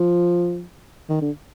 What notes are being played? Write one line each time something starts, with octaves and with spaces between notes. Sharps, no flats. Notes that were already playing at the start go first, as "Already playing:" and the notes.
Already playing: F3
D#3
D3